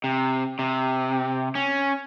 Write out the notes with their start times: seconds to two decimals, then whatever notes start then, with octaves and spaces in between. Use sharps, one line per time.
0.04 C3
0.59 C3
1.55 C#4